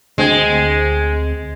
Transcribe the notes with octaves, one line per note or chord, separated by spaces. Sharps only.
D2 G#3 C4 G#6